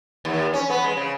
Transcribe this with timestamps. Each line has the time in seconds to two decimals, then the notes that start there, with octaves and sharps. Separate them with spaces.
0.25 D#2
0.54 C#4
0.70 B3
0.84 G#3
0.97 C#3